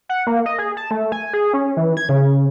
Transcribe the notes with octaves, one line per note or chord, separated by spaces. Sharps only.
F#5
A#3
D#5
G#4
A5
A3
G#5
G#4
C#4
E3
G#6
C#3